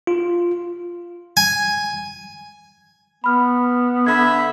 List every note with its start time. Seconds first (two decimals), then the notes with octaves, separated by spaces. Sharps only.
0.07 F4
1.37 G#5
3.24 B3 B5 F6
4.06 D3 E5 B5 G#6